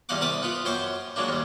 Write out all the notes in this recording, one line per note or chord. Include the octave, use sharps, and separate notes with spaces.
E2 G3 D#5 F5 F#5 D6
C2 A#4 A5 B5 D6 D#6
B3 F4
F#2 C5 G5 C#6 D6
F#3 G#3 A#3 D4
D#2 G3